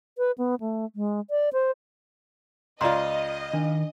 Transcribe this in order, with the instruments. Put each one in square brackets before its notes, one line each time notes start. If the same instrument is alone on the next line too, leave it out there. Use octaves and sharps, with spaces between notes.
[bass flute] B4
B3
A3
G#3
D5
C5
[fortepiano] C#2 F4 [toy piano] D5 A#5 C6 [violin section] D#5
[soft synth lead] D#3 [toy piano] D4